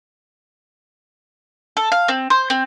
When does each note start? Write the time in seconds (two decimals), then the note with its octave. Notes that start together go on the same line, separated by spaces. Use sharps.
1.77 A4
1.92 F5
2.08 C4
2.30 C5
2.50 C4